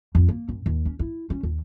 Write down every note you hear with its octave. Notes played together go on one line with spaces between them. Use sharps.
F2
A#3
F#2
D#2
C#4
E4
C#4
D#2